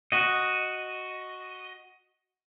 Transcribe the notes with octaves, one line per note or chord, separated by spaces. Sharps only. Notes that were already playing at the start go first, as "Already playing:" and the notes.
F#4 D#5